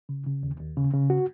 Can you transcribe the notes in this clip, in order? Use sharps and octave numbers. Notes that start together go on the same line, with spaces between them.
C#3
C#3
D#2
D#2
C#3
C#3
F#4